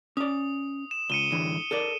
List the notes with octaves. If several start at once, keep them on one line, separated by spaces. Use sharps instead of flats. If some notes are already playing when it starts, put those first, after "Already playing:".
C#4 D5 D#6
E7
C#2 C#7 D#7 G7
A2 D3 E3
A4 A#4 D5